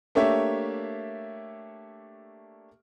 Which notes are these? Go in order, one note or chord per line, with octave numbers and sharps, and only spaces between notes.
A3 A#3 D4 G4 C#5 E5